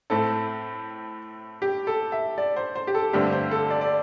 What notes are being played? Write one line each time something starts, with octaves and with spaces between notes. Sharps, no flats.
A2 A3 C4 A4
G4
A4
E5
D5
C5
C5
G4
A4
G2 D3 A3 C4 G4
C5
A4
D5
D5